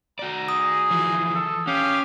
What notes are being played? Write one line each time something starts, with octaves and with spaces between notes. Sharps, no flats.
F#4 D5 A#5
G#4 D#6
E3 F3
A4
C#4 G4 F5